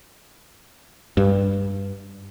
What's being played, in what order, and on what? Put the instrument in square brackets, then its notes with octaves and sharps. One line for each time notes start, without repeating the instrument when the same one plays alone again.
[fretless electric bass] G2